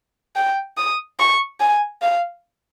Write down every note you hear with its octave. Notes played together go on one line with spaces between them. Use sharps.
G5
D#6
C#6
G#5
F5